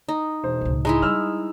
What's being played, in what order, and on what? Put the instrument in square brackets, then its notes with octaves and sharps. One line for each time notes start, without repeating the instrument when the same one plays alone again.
[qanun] D#4
[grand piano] E1 C5
[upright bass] C#2 A2
[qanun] G#3 D#4 E4 [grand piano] A#5
[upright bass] G3 [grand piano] E6 F6